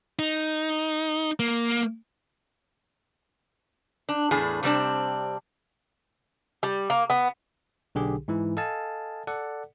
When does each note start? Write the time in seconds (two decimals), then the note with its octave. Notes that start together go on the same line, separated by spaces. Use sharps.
0.19 D#4
1.39 A#3
4.09 D4
4.31 E2 A2 D4 G#4
4.63 C3 G3 C4 D4
6.63 G3
6.90 A#3
7.10 B3
7.95 B1 D3 G4 G#4
8.28 G#2 E3 E4
8.57 A4 D#5 F5 G#5 A5
9.27 A4 D5 F#5